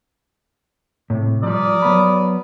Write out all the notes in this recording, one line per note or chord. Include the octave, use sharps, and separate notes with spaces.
A2 C3
F3 G3 A#4 D5 D#6
F#3 B3 B5